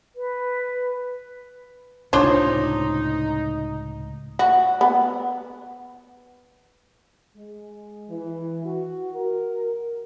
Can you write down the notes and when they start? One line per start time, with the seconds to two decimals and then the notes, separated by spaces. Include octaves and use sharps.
0.16 B4
2.13 C#2 A2 C3 D4 D#4 F4 C5 C#5
4.39 F#4
4.81 B3
7.35 G#3
8.09 E3
8.64 F#4
9.14 A#4